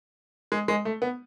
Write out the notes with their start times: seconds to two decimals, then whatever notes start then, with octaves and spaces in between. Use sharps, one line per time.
0.52 G#3
0.68 G#3
0.85 A3
1.02 B3